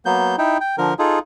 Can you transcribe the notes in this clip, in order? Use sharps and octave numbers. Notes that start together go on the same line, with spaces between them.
F#3 A#3 B3 G6
D#4 E4 G5
G5
D3 F3 A#4
D#4 F4 G#4 A4